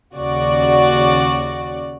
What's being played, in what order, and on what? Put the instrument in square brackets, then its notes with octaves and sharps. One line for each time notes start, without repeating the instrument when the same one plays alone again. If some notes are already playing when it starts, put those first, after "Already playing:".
[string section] D#2 C#3 F#4 D5